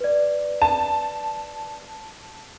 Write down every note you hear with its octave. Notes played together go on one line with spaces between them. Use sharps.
B4 D5
A5